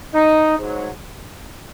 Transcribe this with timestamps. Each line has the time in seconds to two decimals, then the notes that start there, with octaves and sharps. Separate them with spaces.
0.14 D#4
0.58 G#2 F#3